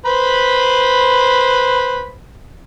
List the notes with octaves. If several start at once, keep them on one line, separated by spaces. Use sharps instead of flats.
B4 C5 B5